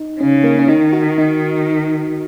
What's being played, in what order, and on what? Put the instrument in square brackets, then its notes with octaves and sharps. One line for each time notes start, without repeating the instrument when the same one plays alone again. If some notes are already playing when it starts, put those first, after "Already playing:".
Already playing: [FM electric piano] D#4
[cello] C#3 [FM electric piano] C#4
[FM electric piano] A#3
C#4
[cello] D#3 [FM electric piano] D#4
[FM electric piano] F#4
D#4